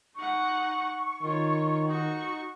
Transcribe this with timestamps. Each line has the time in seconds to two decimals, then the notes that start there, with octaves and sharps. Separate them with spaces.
0.15 D#4 F#5 C#6
1.23 D#3 F4 C#5
1.87 D#4 F#4 C#6